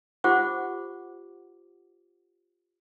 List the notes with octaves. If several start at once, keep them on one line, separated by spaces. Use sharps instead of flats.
F4 G4 C5 F#5 C#6 D6